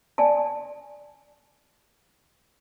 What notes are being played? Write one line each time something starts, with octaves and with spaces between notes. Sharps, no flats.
D5 G#5 A5